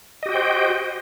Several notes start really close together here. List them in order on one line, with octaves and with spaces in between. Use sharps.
D#5 G4 F#4 G5 C5